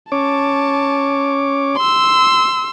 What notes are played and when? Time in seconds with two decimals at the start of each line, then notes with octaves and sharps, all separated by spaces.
0.12 C#4 C#5 A5 D6
1.77 C6 E6